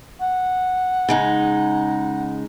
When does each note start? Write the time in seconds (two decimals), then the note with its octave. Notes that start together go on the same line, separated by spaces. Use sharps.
0.21 F#5
1.09 C#3 G#3 D#4